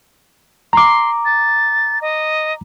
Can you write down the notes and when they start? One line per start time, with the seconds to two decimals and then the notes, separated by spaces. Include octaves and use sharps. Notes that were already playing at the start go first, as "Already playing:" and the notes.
0.73 A#5 C6 D6
1.25 A6
2.01 D#5